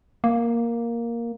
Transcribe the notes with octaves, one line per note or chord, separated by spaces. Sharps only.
A#3